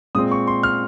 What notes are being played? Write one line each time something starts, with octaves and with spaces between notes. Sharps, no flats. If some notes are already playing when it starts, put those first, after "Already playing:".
A#2 G#3 C4 D#6
C#6
C6
F6